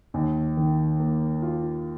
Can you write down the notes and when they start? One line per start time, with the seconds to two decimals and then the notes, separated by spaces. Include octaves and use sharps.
0.14 D#2
0.57 D#3
1.00 A#3
1.42 F4